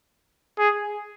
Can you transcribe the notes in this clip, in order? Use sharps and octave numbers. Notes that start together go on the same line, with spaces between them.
G#4